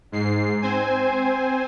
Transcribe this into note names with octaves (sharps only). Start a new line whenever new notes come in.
G#2 C7
C4 C5 G#5